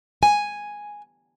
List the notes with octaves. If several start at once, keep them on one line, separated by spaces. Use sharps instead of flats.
G#5